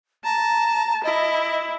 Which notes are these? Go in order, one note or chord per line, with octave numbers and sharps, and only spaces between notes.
A5 A#5
E4 D#5